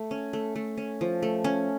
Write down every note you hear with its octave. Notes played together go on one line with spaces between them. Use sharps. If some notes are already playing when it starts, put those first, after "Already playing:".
Already playing: A3
C#4
A3
A3
C#4
F3
A3
C#4